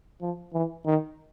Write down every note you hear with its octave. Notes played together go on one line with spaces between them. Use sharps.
F3
E3
D#3